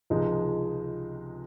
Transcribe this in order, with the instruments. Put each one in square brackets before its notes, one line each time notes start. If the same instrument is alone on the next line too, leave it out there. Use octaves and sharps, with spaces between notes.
[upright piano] C#2 C3 F3 G#3 D#4